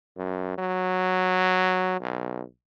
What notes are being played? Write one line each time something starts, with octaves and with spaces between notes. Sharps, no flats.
F#2
F#3
B1